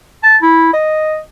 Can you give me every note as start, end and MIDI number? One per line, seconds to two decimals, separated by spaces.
0.23 0.37 81
0.42 0.73 64
0.74 1.18 75